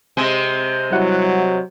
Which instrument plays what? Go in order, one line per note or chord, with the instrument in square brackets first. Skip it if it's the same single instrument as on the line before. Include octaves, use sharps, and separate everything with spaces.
[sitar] C3 G#3
[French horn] F#3 [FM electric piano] G3 E4 F#5